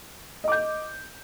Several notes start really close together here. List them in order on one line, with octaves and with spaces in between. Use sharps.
D#5 D6 G6